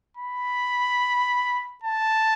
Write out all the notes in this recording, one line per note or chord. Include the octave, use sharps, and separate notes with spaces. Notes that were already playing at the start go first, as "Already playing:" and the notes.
B5
A5